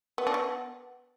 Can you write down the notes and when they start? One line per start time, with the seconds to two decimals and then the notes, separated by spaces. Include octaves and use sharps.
0.18 B3
0.27 D4
0.34 B3